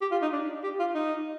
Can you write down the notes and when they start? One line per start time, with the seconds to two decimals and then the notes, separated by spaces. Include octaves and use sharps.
0.01 G4
0.11 F4
0.22 D#4
0.32 D4
0.64 G4
0.79 F4
0.95 D#4